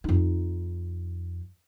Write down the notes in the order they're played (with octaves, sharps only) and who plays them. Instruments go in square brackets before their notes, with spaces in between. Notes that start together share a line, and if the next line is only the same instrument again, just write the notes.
[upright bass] F2 D#4